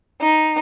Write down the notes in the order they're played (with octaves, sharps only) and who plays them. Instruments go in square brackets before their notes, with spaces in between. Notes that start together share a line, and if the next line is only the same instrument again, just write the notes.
[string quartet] D#4